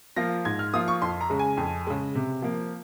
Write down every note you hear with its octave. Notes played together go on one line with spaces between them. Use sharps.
F3 A#3 F4 A#6
G#2 G#6
F6
F3 A#3 F4 D#6
C#6
F2 C6
A#5
C#3 G#3
G#5
F2
C#3 G#3
C3
F3 A#3